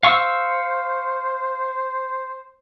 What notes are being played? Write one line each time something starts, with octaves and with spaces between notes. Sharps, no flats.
C5 F5 C#6 E6